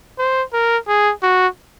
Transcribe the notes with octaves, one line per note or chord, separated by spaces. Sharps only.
C5
A#4
G#4
F#4